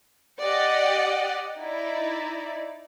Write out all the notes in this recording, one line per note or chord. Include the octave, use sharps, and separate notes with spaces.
G4 D5 D#5 F#5
D#4 E4 D5